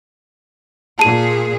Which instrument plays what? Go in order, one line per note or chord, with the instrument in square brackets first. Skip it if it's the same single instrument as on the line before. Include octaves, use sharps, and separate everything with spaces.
[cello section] A#2 G#4 [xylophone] A5 D#7